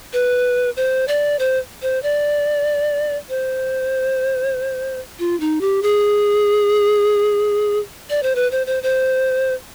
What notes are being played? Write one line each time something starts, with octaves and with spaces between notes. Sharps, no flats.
B4
C5
D5
C5
C5
D5
C5
F4
D#4
G4
G#4
D5
C5
B4
C5
C5
C5